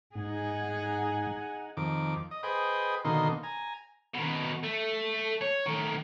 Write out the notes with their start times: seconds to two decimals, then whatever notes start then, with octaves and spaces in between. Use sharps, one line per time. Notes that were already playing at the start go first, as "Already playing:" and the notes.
0.15 G#2 D#4 G#4 F#5 G#5
1.77 F2 D#3 D6
2.31 D#5
2.43 G#4 B4 C5 D#5 G5
3.05 B2 D3 D#3 A#3 D#4 C6
3.43 G#5 A#5
4.14 B2 D#3
4.63 A3
5.41 C#5
5.66 D#3 A3